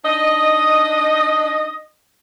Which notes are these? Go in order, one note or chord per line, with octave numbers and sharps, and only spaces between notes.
D4 D#4 D#5